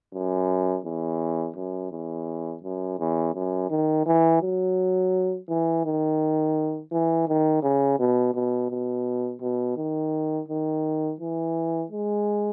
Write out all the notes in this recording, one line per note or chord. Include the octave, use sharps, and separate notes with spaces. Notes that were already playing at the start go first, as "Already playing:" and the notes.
F#2
E2
F#2
E2
F#2
E2
F#2
D#3
E3
F#3
E3
D#3
E3
D#3
C#3
B2
B2
B2
B2
D#3
D#3
E3
G#3